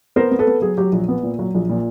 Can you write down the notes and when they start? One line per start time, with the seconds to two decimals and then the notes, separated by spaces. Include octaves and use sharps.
0.16 B3 A#4 C5
0.31 B3
0.39 A4 B4
0.47 B3
0.61 F#3 G#4
0.77 F#3 G4
0.92 A#1
1.08 B3
1.23 A#2
1.39 F#3
1.54 A#1
1.70 A#2